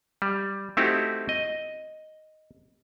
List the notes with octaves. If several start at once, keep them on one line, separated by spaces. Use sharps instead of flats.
G3
A3 C4 D#4 E4 F#4 G4
D#5